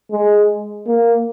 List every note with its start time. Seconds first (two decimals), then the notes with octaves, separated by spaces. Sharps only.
0.12 G#3
0.88 A#3